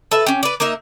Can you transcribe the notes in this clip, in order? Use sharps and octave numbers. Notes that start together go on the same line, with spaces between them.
A4 B4 E5
C#4 G4
B4 D5
A#3 D#4 A#4 E5